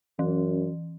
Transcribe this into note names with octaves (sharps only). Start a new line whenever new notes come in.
F#2 E3